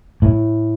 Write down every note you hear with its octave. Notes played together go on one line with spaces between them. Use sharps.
A2